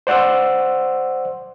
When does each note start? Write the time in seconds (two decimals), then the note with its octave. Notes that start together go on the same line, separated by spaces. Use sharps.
0.07 C5 D5 F#5 C6 E6